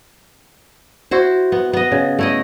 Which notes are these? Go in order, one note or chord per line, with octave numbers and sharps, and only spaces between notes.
E4 F#4 C5
B3
B3 D#5
C#3
A3 E4 D#5